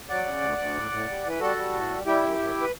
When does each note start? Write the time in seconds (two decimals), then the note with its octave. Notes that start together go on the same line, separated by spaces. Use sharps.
0.09 F#3 D5 F#5
0.26 C#3
0.42 D2
0.58 D2
0.75 A2
0.91 A2
1.08 G3
1.24 E3
1.29 B4
1.40 G3 F#4 A4
1.57 G3
1.73 A2
1.90 G3
2.06 G3 E4 G4
2.23 F#2
2.39 F#2
2.61 B4